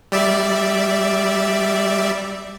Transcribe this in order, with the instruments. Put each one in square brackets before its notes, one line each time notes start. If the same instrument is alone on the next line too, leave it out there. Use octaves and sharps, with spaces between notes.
[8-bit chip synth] G3 D5 E5